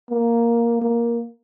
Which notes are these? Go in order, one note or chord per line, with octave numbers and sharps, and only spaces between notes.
A#3
A#3